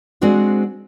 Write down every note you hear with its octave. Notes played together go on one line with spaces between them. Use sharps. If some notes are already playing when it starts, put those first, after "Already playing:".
G#3 C4 D4 F#4 C5